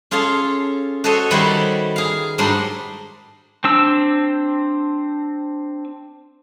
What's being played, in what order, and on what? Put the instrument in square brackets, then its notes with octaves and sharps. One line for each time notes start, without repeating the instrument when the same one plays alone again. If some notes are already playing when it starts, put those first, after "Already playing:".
[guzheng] C#4 F4 G#4 A4 F5
F#4 A4 C5 C#5 D#5 G#5
D#3 G3 E4 F#4 C5 C#5
G#4 F5
G#2 F#3 G3 D4 D#4 C6
[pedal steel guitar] C4 D4 E6